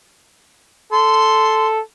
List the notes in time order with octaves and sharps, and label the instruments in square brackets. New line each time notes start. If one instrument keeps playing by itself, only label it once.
[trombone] A4 [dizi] C6